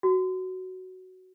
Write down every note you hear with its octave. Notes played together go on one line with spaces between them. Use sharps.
F#4